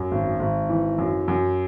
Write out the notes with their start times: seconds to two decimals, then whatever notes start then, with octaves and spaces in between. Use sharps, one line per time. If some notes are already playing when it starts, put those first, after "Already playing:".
Already playing: F#2
0.11 G#1
0.40 G#1
0.69 E3
0.98 F#2
1.28 F#2